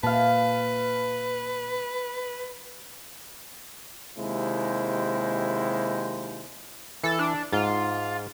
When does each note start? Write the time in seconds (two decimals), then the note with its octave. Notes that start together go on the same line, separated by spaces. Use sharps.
0.03 A#2 B4 F5 A5
4.17 D#2 C3 G#3 E4 C5
7.04 E3 A4
7.19 D4
7.52 G#2 F4